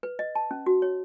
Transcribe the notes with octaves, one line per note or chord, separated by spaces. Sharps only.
B4
D#5
A5
C#4
F#4
C#5